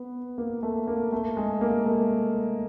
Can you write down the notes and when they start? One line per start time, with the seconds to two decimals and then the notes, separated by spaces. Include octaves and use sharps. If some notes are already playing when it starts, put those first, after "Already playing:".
Already playing: B3
0.38 A#3
0.63 A3
0.87 A#3
1.12 A3
1.37 G#3
1.61 A#3
1.86 A3